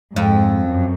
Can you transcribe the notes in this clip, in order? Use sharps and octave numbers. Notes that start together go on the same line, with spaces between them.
F2 G#2
F#2